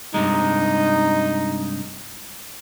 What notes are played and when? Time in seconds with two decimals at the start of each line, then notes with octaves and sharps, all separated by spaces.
0.14 G2 C3 G#3 D#4